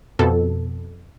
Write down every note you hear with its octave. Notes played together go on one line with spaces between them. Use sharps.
F2 B2 A4